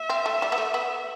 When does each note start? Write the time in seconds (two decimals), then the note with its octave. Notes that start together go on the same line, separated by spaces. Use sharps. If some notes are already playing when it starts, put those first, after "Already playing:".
Already playing: E5
0.10 C4
0.26 A3
0.42 G3
0.52 B3
0.58 A3
0.74 B3